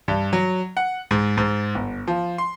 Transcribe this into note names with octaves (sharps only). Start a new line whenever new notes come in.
G2
F#3
F#5
G#2
G#2
G1
F3
C6